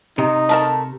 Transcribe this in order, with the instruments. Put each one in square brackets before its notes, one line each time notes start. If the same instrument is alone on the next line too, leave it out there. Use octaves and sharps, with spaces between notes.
[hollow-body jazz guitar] C3 [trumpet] D#4
[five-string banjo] A3 A#4 A5